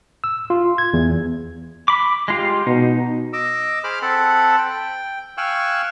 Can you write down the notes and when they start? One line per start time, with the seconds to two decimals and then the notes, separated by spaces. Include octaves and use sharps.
0.24 E6
0.50 F4
0.78 G#6
0.93 E2
1.88 B5 D6
2.28 G#3 F4 G4
2.67 B2 D#4
3.33 D#5 D6 E6
3.84 G#4 C5 B5 D6 F6
4.02 C4 A4 F#5 A5 B5
4.58 G5
5.38 F5 G5 G#5 C#6 E6 F#6